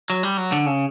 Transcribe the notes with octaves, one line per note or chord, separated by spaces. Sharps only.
F#3
G3
F#3
D3
C#3